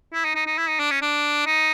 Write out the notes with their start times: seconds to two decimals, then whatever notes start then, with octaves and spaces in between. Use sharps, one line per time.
0.13 E4
0.24 D#4
0.35 D#4
0.47 D#4
0.58 E4
0.69 D#4
0.80 D4
0.91 C#4
1.02 D4
1.46 D#4